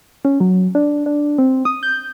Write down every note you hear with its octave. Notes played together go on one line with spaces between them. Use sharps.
C#4
F#3
D4
D4
C4
D#6
G6